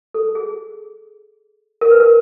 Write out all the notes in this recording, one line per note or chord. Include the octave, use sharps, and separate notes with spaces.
A4
G#4
A#4
B4
A#4